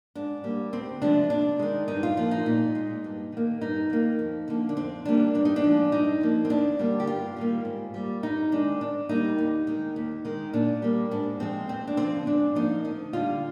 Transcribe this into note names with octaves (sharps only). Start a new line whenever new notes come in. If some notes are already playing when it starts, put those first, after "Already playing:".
G#2 D4
G3 A#3
D2 C4
C3 F3 G#3 D4
D#2 D4
D#3 G#3
G2 D#4
F4
F3 A#3 F4
D#4
A#2
G#3
G2
D#3 A#3
G2 D#4
D#3 A#3
F2
D3 F3 A#3
D4
F2 C4
D#3 G3 A#3 D4
G2 D4
D#4
D4
F3 G#3
G2 D#4
F3 A#3
C4
D#2 D4
D3 G3 A#3
G4
G2 F4
D#3 G3 A#3
G#2
G3 A#3
G2 D#4
D#3 G#3 D4
G#2 D4
G3 A#3 D#4
D#2
D#3 G#3
D#2
D#3 G#3
A#2 D4
G3 A#3
G#2 D4
F3 G#3 C4
D#2 C4
D4
D3 F3 C4
G#2 D4
F3 A#3 D#4
D2 D#4
D3 G3 F4